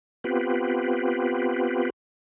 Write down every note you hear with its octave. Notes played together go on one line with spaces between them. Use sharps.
B3 C4 F4 G4 B4